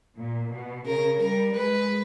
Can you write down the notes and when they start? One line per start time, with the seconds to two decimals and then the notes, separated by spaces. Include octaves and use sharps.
0.17 A#2
0.52 B2
0.86 C#3 A#4
1.20 G3 A#4
1.54 G#3 B4